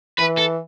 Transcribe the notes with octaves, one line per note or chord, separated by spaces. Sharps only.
E3 B4
A4